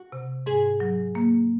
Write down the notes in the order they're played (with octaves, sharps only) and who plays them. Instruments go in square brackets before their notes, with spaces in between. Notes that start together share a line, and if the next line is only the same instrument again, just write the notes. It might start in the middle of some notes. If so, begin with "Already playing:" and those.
Already playing: [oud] F#4
[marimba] C3
[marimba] G#2 [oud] G#4
[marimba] F#3
A#3